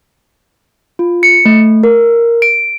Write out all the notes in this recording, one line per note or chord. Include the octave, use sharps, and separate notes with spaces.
F4
C#7
A3
A#4
D7